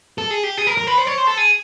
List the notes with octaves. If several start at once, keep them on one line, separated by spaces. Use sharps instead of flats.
A4
G#4
G4
G#4
A#4
A#4
B4
C5
C#5
C5
A4
G#4